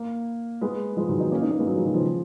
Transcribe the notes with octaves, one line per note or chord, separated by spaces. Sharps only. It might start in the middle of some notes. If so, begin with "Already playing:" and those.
Already playing: A#3
G#3 B3
F3 G#3
D#3 F#3
B3 D#4
A#3 C#4
B3 D#4
A#3 C#4
G#3 B3
F#3 A#3
F3 G#3
D#3 F#3
C#3 F3